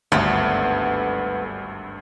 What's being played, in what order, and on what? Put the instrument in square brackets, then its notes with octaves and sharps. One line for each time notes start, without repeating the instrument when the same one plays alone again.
[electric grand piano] G#1 D2 G2 [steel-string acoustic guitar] A3 B3